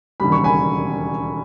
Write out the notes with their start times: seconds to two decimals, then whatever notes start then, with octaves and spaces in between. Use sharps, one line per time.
0.20 E1 D#2 C#3 G3 B5
0.32 C#6
0.44 G#5 B5